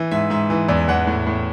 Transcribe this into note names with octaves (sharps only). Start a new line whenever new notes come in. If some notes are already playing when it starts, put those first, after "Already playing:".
Already playing: E3
G#2 E5
G#2 E5
E3
E2 D5
E2 F#5
A2
A2